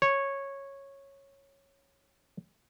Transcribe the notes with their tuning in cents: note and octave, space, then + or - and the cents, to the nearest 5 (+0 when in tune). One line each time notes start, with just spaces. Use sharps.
C#5 -10